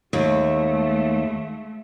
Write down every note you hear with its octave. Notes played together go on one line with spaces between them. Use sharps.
D#2 G#3 A3